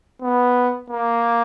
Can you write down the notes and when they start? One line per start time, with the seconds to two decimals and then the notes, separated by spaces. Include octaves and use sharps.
0.22 B3
0.90 A#3